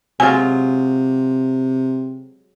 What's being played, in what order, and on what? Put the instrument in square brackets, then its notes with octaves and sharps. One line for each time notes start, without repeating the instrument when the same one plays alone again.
[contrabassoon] C3 [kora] F#3 G#3 F4 [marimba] G#5